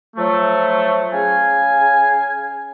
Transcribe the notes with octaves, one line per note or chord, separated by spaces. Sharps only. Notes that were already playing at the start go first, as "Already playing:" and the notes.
F3 F#3 A3
C#3 G#4 F5 G#5